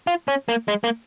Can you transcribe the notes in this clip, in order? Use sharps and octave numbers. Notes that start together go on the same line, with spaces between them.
F4
C#4
A#3
G#3
A#3